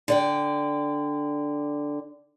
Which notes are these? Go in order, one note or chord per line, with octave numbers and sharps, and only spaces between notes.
D3 D5 G5